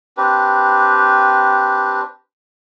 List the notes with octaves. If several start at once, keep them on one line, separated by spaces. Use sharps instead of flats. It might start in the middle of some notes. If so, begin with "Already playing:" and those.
C4 D4 G4 B4